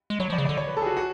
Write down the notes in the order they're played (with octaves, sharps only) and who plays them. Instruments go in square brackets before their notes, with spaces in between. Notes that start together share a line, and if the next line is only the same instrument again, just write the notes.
[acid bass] G#3
[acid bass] F#3 [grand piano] C#5
[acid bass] F3 [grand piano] D5
[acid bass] C#3
[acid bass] D3 [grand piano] D5
[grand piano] C#5
B4
A4
G#4
F#4
F#4